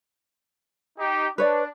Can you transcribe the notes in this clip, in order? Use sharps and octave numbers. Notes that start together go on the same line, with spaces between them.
D#4 G4
D4 B4 C#5 D5